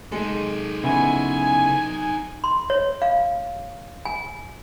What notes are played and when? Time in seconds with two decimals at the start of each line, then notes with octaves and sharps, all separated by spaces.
0.12 G#3 D#4 A4
0.84 C#3 B3 E4 G#5
2.44 C6
2.70 C#5
3.02 F5
4.05 G#5